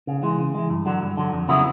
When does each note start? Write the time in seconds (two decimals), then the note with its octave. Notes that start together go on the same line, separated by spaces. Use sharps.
0.07 C#3
0.23 E3 G#3
0.39 C#3
0.54 E3 G#3
0.70 G2
0.86 D3 F#3
1.02 G2
1.17 D3 F#3
1.33 F2
1.48 C#3 F#3 B3 E4